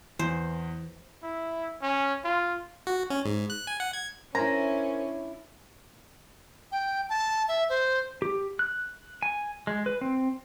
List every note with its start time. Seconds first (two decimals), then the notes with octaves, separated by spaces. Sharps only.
0.19 E2 E3 C5
1.23 E4
1.82 C#4
2.24 F4
2.87 F#4
3.10 C#4
3.25 G#2
3.50 F#6
3.67 G#5
3.80 F#5
3.93 G#6
4.35 C#4 D4 E4 A#4 C5 G#5 A#5
6.72 G5
7.09 A5
7.48 E5
7.70 C5
8.22 G4
8.59 F#6
9.22 G#5
9.67 G#3
9.86 B4
10.01 C4